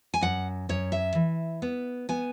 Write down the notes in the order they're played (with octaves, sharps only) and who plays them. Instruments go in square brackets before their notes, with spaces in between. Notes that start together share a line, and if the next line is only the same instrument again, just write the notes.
[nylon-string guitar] G#5
F#2 F#5
F#2 C#5
E5
E3
B3
B3 G#5